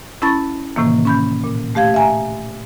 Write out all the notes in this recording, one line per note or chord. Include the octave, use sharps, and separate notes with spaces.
C#4 E4 A5 B5 C#6 A6
A2 C3 D#3 E3 A#3
C#4 B5 G6
A#2
A3 G4 F5 G#6
E5 G#5 A#5